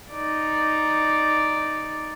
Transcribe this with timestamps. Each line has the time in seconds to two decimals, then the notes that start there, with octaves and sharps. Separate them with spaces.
0.12 D#4 D5